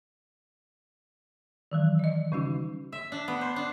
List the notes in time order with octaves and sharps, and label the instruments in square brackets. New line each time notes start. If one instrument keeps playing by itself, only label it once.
[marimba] D#3 E3 F#3
D5 D#5
C#3 G3 C#4 D#4 F#4
[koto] E5
D4
B3
C5
D4